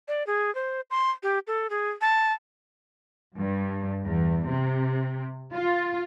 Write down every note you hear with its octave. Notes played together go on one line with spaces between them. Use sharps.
D5
G#4
C5
C6
G4
A4
G#4
A5
G2
E2
C3
F4